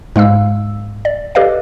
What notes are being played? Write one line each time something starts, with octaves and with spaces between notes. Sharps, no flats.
G#2 G#3 F5 E6
D5
G4 A4 B4 D5 D#5 F5